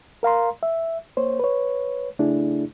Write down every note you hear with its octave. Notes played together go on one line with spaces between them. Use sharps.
A#4 F5 A#5 C6
E5
A#3 C5 C#5
B4 C#5
C#3 A3 D4 E4 G#4